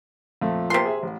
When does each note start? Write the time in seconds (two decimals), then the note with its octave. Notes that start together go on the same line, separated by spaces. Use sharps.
0.41 F2 A#2 A3
0.70 C3 A#3 F4 C6
0.85 G#4 E5
1.03 A1